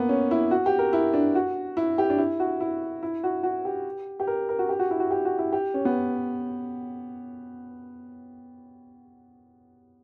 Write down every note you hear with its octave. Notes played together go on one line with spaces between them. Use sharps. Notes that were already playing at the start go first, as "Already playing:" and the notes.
Already playing: A#3 B3
C#4
E4
F#4
G4
A#4
E4
D4
F#4
E4
G4
D4
E4
F#4
E4
E4
F#4
F#4
G4
G4
A#4
A#4
F#4
G4
F#4
E4
F#4
G4
F#4
E4
G4
C#4
B3